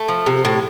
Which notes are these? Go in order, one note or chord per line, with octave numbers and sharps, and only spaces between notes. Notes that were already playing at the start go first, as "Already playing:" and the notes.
Already playing: A3
F3
C3
A2